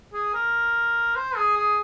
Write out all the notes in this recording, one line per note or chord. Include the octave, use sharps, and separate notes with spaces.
G#4
A#4
C5
G#4
G#4